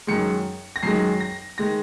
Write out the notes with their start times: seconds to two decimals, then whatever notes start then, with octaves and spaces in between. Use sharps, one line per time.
0.07 F#2 D#3 G#3 C#7
0.76 A#6
0.83 F#2 D#3 G#3 C7
1.20 A#6
1.58 D#3 G#3 A#6